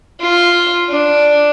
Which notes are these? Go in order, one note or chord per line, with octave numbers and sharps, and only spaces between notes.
F4
D4